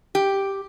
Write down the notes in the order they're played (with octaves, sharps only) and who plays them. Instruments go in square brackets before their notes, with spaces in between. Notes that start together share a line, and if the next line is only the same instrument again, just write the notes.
[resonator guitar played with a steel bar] G4